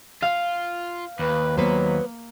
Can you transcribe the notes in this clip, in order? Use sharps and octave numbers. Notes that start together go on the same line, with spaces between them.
F4 F5 F6
D#2 B4
F#3 A#3 B3 B4 C5